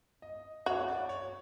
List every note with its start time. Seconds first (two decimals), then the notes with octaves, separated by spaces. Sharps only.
0.22 D#5
0.66 F#4 C#5
0.88 D5
1.09 C#5